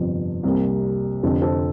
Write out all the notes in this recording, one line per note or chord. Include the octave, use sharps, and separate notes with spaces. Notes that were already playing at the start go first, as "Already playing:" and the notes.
Already playing: G1 F2 C3 F3
C2 C3 G3 A#3
F1 F2 D3 A4
A4 C5